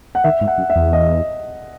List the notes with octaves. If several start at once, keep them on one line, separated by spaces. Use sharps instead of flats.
F#5
D#3 E5
G#2
F#5
F#2
E5
E2
D#5